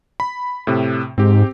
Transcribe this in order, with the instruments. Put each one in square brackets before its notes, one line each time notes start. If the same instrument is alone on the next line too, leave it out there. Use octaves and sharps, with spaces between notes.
[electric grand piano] B5
A2 C3
[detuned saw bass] G#2 [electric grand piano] C4 G4